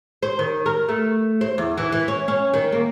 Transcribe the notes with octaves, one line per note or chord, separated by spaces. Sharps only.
C5
D#3
A#4
A3
C5
E2
E3
E3
C#4
C#4
D#3
A#3